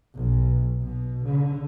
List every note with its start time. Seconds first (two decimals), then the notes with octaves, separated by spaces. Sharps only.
0.15 B1
0.82 B2
1.24 D3